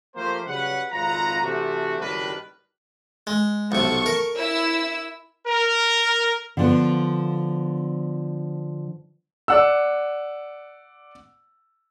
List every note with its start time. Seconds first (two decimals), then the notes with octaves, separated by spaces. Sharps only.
0.16 F3 A3 A#3 G4 A#4 C5
0.47 C#3 F#3 G3 B4 F#5
0.92 G#1 F2 F4 B4 F#5 A#5
1.42 C3 E3 A3 D4 F#4
2.00 F#1 D#3 G3 D4 A#4 B4
3.27 G#3
3.72 B1 C3 A4 C#6
4.06 A#4
4.37 E4 E6
5.46 A#4
6.57 D3 F3 B3
9.48 D5 F#5 E6